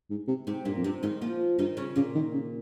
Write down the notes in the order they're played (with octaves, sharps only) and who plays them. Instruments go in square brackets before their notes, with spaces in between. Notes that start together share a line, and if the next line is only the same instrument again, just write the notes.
[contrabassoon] G#2
C3
[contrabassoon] G#2 [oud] C3 C4
[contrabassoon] G2 [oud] A#2 A#3
[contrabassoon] F2
[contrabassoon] G2 [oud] C3 C4
[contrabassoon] G#2 [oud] D#3 D#4
[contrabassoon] A#2 [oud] F3 F4
[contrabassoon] G2 [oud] D#3 D#4
[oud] C#3 C#4
[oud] A#2 A#3 [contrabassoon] C#3
[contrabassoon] D#3
C#3